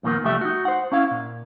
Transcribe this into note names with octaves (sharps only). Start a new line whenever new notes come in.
F2 A#2 D#3 A#3 B3
C2 F3 G3 A3 G4 E5
D#4 F#4
C5 F#5
C#4 E4 F5
A#2